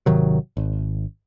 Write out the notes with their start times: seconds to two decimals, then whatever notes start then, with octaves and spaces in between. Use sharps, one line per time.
0.06 G#1 C3 D#3 F#3
0.57 G#1